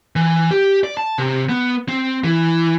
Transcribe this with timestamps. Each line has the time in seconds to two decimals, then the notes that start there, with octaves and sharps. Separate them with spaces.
0.16 E3
0.51 G4
0.84 D5
0.97 A5
1.18 C3
1.49 B3
1.89 C4
2.24 E3